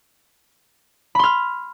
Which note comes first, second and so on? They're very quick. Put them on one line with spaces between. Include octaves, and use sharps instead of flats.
B5 C6 F6